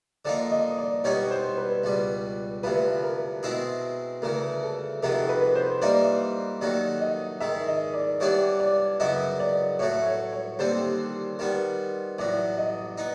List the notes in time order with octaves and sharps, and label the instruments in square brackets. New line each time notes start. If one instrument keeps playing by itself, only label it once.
[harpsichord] D3 F3 A#3 D#4 [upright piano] D5
[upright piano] D#5
D5
[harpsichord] B2 G3 B3 D#4 [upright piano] C#5
[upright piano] C5
B4
[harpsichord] C#2 B2 G3
[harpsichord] D2 C3 F3 [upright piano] B4
[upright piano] A#4
[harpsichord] B2 G#3 C4 E4 G#4
[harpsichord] D2 C#3 E3 [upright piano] A#4
[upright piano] A4
[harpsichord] F2 C3 D#3 G#3 B3 [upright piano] A#4
[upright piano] B4
C5
[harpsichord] E3 G3 A#3 D#4 [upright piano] D5
[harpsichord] D#2 D#3 F#3 A3 [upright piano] D5
[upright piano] D#5
[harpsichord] G#2 D#3 G#3 [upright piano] E5
[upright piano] D#5
D5
[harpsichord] E3 G3 B3 D4 G4 [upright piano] C#5
[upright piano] D5
[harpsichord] F#2 C#3 F#3 B3 E4 [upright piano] D#5
[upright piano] D5
[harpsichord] A2 F#3 A3 [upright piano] C#5
[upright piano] C#5
C#5
[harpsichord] D#2 D3 G3 C4 [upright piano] C5
[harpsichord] D#3 G3 B3
[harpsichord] A1 A2 F#3 [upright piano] D5
[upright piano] D#5
[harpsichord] B3 D#4